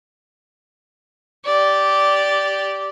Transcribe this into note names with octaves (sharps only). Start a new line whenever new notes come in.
G4 D5